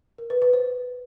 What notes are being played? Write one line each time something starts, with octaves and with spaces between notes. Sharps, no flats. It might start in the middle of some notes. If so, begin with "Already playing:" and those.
A#4
B4
B4
C5